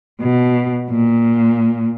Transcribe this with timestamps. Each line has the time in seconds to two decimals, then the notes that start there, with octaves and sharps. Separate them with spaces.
0.21 B2
0.90 A#2